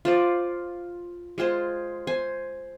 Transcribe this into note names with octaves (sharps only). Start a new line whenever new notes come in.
F4 C5 D5
G#3 F4 G#4 C5
C5 G#5